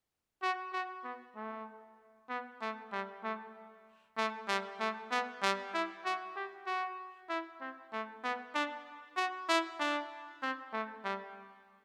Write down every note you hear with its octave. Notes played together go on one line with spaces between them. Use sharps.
F#4
F#4
B3
A3
B3
A3
G3
A3
A3
G3
A3
B3
G3
E4
F#4
G4
F#4
E4
C4
A3
B3
D4
F#4
E4
D4
C4
A3
G3